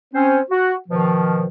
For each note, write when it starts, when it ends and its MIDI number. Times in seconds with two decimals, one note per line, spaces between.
0.14 0.40 60
0.14 0.40 61
0.14 0.40 72
0.51 0.74 66
0.89 1.47 47
0.89 1.47 51
0.89 1.47 53